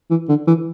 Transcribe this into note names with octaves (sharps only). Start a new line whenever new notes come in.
E3
D3
E3